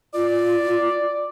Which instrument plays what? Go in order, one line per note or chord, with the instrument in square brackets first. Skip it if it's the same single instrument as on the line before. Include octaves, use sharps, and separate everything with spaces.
[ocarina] F4 [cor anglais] D5